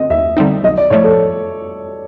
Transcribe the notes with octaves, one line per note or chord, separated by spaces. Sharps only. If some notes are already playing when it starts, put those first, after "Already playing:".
Already playing: D3 C4 D#5
D#2 E5
D3 G3 C4 D#4
B1 D#5
D5
A2 F3 A3 C#5
A4